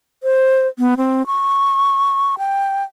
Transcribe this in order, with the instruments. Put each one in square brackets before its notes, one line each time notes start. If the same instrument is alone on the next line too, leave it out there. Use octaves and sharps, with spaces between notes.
[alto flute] C5
B3
C4
C#6
G5